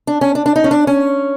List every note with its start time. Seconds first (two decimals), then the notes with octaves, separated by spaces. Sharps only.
0.07 D4
0.21 C#4
0.35 D4
0.46 D4
0.56 D#4
0.64 C#4
0.71 D4
0.87 C#4